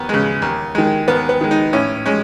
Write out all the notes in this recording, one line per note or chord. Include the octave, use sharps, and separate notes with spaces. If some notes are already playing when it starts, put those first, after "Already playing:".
Already playing: D#2 B3
C#3 G#3
D#2
D#3 G#3
D#2 B3
B3
D#3 G#3
D#4
A2 C#4
G#3 C#4